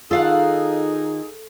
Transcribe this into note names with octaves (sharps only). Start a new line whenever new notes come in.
D#3 D#4 F4 G#4 A4 F5 F#5